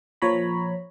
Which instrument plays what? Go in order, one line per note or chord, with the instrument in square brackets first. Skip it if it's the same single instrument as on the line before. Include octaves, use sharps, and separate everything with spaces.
[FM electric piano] A#2 F3 C#5 A#5 B5